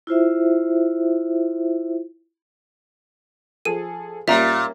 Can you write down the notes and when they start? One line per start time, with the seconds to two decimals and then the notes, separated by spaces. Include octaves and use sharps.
0.07 E4 F4 C5 E5
3.65 F3 G#4 A4 D#7
4.28 A#2 G3 A#3 C#4 E5 A#5